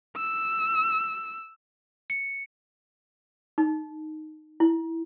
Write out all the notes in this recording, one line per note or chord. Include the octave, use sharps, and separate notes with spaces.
E6
C#7
D#4
E4